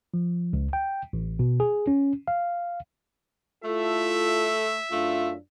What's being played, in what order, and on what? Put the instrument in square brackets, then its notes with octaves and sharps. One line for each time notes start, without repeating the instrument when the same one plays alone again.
[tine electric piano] F3
C#2
G5
A1
B2
G#4
C#4
F5
[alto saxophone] A3 [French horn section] E4 F4 [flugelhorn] A4 [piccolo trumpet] E5
[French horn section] F#2 D4 [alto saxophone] A3 [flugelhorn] F4